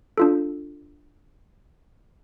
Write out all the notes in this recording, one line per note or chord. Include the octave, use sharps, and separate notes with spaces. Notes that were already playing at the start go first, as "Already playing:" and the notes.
D4 F4 A4